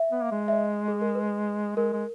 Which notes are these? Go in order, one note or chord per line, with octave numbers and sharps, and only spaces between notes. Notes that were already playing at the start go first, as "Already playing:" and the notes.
Already playing: E5
B3
A#3
G#3
E5
D#5
G#4
A#4
B4
G#3 A#4
G#3